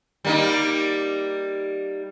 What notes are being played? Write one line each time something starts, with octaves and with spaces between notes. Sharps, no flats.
G3 A#3 D#4